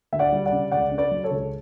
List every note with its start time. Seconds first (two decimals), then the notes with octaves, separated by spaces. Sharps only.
0.12 D2 E5
0.19 D5 F#5
0.32 G3
0.46 D5 F#5
0.52 C#3
0.71 C#2 D5 F#5
0.91 C#3
0.98 B4 D5
1.11 F#3
1.24 A4 C#5
1.31 C#2